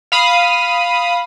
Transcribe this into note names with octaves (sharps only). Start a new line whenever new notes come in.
F5 B5 D#6